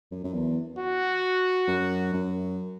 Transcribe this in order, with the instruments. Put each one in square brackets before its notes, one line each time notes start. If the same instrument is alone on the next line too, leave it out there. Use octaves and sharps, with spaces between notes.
[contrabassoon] F#2
F#2
E2
[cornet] F#4
[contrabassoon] F#2
F#2